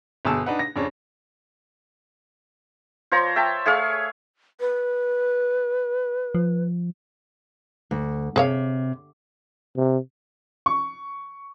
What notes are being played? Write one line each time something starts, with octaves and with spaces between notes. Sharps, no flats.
G1 B2 G#4 A5 E6
D4 D#4 B4 F#5
A#6
F2 C#3 D4 C#5
F3 C5 C#5 A#5
E5 G5 A5
A3 G#4 C#5 F5
B4
F3
D2
C3 G#4 C#5 F5
C3
C#6